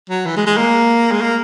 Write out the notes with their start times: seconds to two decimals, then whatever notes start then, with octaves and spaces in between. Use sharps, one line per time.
0.10 F#3
0.26 E3
0.36 G#3
0.47 G#3
0.57 A#3
1.12 G#3
1.22 A#3